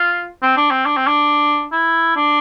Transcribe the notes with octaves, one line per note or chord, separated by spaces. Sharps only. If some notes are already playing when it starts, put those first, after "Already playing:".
Already playing: F4
C4
D4
C4
D4
C4
D4
E4
D4